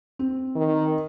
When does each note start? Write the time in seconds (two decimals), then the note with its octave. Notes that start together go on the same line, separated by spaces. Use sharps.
0.19 C4
0.55 D#3